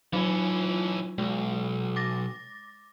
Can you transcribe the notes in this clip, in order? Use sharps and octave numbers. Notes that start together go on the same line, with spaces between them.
E3 F#3 C#4 D#4 F4
B1 G#3
D6 A6 A#6